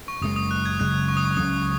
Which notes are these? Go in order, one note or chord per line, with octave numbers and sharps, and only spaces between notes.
C#6
F#1 F#2 C#3 G#3 D#6
D#6
F#6
G#6
F#1 F#2 C#3 G#3 F#6
C#6
D#6
C#6
C#2 C#3 F#3 C#4 D#6